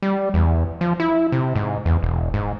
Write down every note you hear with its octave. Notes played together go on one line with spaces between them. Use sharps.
G3
E2
F3
E4
C3
G#2
E2
E1
G#2